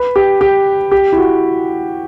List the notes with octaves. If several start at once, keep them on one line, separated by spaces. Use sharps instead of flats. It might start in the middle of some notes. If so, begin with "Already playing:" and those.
Already playing: B4
G4
G4
G4
E4
F#4